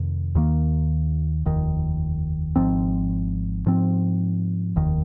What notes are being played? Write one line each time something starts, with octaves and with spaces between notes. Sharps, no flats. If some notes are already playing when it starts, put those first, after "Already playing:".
Already playing: F2 C3 D#3
D#2 D#3 A#3
F1 D#2 D#3
G#1 G#2 F3 C4
G#2 F3 C4
F1 D#2 D#3